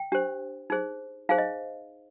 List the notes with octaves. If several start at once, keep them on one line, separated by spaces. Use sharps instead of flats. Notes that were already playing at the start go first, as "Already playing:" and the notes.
Already playing: G5
D4 G4 C5
D#4 G#4 C5
D#4 G#4 C5 F5
D#5